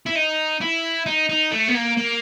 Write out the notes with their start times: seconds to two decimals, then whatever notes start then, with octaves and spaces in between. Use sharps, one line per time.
0.06 E4
0.15 D#4
0.61 E4
1.06 D#4
1.29 D#4
1.52 A3
1.68 B3
1.75 A#3
1.97 A#3